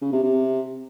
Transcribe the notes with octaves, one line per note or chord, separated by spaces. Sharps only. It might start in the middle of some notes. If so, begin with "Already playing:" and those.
C#3
C3
C3